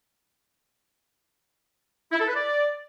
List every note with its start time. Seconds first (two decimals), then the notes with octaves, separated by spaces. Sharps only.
2.12 E4
2.20 A4
2.27 B4
2.35 D5